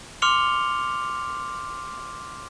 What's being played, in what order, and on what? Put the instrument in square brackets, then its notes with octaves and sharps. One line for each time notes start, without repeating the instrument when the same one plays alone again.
[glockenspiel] C6 D6 F6 C#7 F7 G7